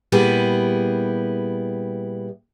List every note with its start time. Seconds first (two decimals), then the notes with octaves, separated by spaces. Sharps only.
0.12 A#2 G3 B3 E4 G4 G#4